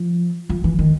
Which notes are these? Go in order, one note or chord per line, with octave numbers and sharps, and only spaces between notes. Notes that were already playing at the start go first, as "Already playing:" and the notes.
Already playing: F3
F3
E3
D#3